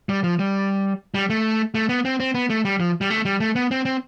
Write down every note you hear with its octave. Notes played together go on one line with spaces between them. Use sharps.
G3
F3
G3
G3
A3
A3
B3
C4
C4
B3
A3
G3
F3
G3
A3
G3
A3
B3
C4
C4